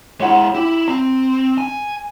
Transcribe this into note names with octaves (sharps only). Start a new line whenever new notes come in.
G#3 E4 C#5 F#5
E4 G4
C4 A#5
G#5